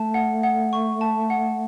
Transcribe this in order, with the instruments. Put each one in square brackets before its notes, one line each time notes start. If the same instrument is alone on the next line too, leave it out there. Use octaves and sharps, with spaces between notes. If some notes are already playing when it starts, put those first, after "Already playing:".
Already playing: [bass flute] A3 [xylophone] A5
[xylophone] F#5
F#5
C#6
A5
F#5